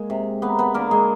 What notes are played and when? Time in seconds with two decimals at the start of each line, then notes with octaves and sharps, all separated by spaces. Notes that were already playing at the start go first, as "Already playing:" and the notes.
Already playing: G#3 A#3
0.10 C3
0.42 A#3 B3 B4
0.59 B3 B4
0.74 D3 A#3 A#4
0.91 G#3 G#4